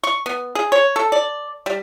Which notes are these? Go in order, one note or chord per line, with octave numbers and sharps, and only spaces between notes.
C#6
B3
G#4
C#5
A4
D5
G3